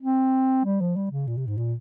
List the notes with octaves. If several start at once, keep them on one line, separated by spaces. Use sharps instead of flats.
C4
G3
F3
G3
C#3
A#2
C3
G#2
A#2